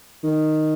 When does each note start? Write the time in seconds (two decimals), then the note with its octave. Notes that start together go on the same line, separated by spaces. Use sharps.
0.23 D#3